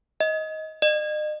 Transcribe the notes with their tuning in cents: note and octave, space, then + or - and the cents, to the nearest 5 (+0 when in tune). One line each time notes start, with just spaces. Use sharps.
D#5 +15
D#5 -40